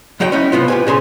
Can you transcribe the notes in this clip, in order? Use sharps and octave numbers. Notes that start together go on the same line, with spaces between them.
D#2 F#3 F#4 F#5 G5
C#4 D#4 E4
A2 C3 B3 F4
G4 B4 G#5
A#2 C#3 G#5 C6